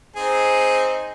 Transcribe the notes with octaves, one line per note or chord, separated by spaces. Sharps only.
C4 D#4 G#4